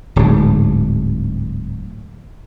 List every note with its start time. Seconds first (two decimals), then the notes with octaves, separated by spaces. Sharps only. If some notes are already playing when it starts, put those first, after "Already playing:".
0.16 D1 G#2